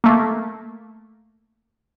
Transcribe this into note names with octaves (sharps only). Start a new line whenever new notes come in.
A3 A#3